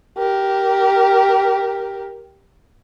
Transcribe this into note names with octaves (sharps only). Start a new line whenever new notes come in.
G4 A#4